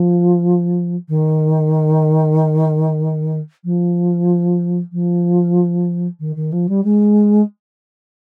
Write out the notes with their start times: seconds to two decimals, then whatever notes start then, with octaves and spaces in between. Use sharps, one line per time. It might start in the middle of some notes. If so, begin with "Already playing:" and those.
Already playing: F3
1.09 D#3
3.64 F3
4.92 F3
6.20 D#3
6.36 D#3
6.52 F3
6.69 G3
6.84 G#3